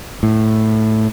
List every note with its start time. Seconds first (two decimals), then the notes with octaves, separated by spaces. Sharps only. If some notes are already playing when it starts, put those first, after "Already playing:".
0.23 A2